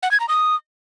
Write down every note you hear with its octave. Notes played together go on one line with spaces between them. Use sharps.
F#5
G#6
A#5
D#6